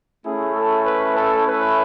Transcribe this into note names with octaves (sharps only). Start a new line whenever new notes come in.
A3 C#4 E4 G#4
A4
B4
A4
B4